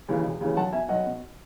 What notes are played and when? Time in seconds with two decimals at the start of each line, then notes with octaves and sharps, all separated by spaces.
0.08 D#2 C#3 E3
0.24 E1
0.40 D#2 C#3 E3
0.56 B1 F#5 A5
0.73 B2 E5 G#5
0.89 B1 D#5 F#5
1.06 B2